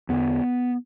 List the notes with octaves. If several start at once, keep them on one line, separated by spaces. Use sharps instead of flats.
E2 D3 B3